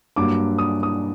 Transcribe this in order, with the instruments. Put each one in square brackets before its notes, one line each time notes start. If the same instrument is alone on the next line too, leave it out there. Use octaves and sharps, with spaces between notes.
[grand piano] G2 F#3 A#3 D6
D#6
D#6